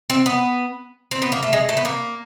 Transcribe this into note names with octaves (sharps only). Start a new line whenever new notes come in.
C4
B3
C4
B3
A#3
A3
G#3
A3
B3
A#3